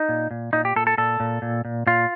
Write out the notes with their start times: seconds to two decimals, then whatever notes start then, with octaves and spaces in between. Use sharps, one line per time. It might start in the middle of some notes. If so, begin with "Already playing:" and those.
Already playing: D#4
0.09 A#2
0.31 A#2
0.53 A#2 D#4
0.65 G4
0.76 A#2 A4
0.87 A4
0.98 A#2 A4
1.20 A#2
1.42 A#2
1.65 A#2
1.87 A#2 F4